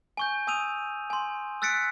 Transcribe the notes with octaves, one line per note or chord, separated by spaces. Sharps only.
G#5 C#6 G6
G#5 D#6 E6 D#7 F7
G#5 C6
E6 F#6 A6 B6 C#7 D7